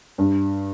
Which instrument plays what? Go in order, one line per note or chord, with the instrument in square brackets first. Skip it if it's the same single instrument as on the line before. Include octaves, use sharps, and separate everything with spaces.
[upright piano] G2